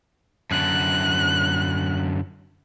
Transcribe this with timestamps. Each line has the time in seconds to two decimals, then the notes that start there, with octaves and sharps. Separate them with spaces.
0.51 F#2 D3 F#6